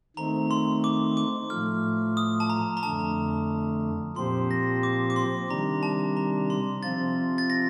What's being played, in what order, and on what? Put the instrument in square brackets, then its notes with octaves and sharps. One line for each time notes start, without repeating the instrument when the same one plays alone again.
[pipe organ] D#3 A3 C4 D#4 [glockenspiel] A#5
[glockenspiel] C6
D6
D6
[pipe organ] A2 F3 A3 [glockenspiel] F6
[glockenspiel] D#6
A5
A#5
A#5
[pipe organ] F2 D3 A3 [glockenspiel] A5
[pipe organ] A#2 F3 C4 G4 C5 [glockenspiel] C6
[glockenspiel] A#6
D6
D6
C6
[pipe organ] C3 D#3 G3 D4 [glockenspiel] A#5
[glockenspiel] A5
A#5
C6
[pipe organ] C3 F3 C4 F4 [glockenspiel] A6
[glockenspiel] A6
A#6